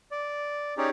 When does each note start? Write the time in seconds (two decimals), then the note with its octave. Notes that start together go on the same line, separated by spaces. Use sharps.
0.12 D5
0.78 C#4 D#4 G4 G#4 C#5 D5